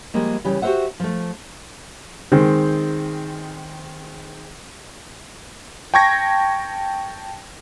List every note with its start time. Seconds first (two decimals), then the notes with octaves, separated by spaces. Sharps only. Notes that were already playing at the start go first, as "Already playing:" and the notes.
0.14 F3 G3 G#3 A#3
0.44 C#3 E3 G3
0.62 F#4 G4 A#4 C5 E5 F#5
1.00 F3 A3
2.32 D#3 G#3 C4
5.94 G5 A5 C#6 G#6 A#6